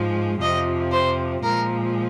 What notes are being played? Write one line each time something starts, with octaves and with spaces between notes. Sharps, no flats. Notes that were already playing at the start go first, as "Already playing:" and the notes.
Already playing: G#2 F3 G#3
F2 C3 F3 D#5
C5
A#2 F3 G#3 A#4